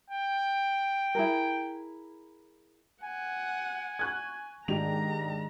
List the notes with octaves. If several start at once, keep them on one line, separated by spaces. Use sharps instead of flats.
G5
E4 G#4 A#4
F#5 G#5
C#6 F#6 G#6
G#2 D#3 G#3 D4 G4 A#5 F7